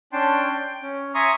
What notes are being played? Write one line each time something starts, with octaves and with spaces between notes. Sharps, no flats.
C#4 D4 G5 A5 C6
G5
C#4
E5 G#5 A#5 C6 C#6 D#6